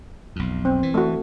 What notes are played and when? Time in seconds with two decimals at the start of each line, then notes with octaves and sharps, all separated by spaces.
0.36 B1 F2
0.65 C4
0.83 E3
0.94 A3 F#4